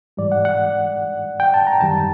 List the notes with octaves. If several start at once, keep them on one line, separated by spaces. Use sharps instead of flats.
G#2 E3 G3 D5
F#5
F#5
G5
A5
A#5
F#2 D#3 G3 A5